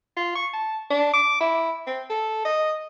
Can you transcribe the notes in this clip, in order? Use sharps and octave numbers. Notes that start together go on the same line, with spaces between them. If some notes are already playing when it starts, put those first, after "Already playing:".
F4
C#6
A5
D4
D6
E4
C4
A4
D#5